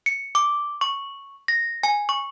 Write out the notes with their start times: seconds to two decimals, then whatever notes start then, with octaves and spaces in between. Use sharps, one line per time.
0.06 C#7
0.35 D6
0.81 C#6
1.48 A#6
1.83 G#5
2.09 C#6